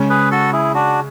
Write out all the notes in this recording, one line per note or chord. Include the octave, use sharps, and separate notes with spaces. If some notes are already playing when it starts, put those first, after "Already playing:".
Already playing: C#3 G#3 C#4
G#4 B4
F#4 A4
E4 G#4
D4 F#4